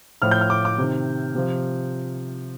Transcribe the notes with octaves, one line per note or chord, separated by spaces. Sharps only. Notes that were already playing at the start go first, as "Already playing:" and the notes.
A2 F3 F6
G6
F6
D6
D6
C3 D#3
C3 F3